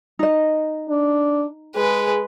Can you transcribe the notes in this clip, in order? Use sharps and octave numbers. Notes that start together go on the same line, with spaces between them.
D#4 D#5
D4
G#3 G#4 B4